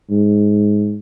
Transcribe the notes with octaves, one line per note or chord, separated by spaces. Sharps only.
G#2